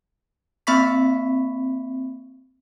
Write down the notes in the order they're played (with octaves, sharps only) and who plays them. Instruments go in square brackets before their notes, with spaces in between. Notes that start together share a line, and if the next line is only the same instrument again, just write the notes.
[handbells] A#3 C4 E5 B5 C#6 B6